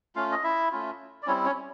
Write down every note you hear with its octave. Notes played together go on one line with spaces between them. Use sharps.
A3 C#4 F4 F5
D#5
E4 E5
A3 C#4 F4
D5
G3 C4 C#4 E4 C#5
C#4 C#5